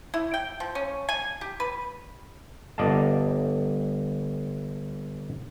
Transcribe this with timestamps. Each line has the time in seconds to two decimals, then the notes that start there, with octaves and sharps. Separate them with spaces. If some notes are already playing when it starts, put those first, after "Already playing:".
0.14 E4
0.34 G5
0.60 F3
0.75 C#4
1.09 G#5
1.41 G4
1.60 B4
2.78 G1 D5 D#5 F5 A5